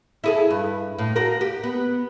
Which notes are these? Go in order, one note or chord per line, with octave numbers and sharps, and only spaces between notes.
E4 G#4 A4
G2
A2
F#4 A#4
G4
B3